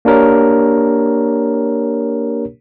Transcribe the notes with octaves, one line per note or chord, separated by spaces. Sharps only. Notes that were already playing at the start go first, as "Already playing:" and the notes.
A#3 D4 G4 A#4 C#5